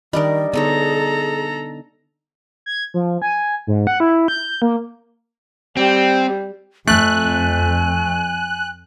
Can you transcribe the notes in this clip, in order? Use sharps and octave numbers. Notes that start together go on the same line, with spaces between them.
D#3 G3 D4 A#4 D5 D#5
D3 B3 D#4 G#4 A4 C#5 A#5
G#6
F3
G#5
G#2
F#5
E4
G6
A#3
G3 C4
F2 A3 G#5 F#6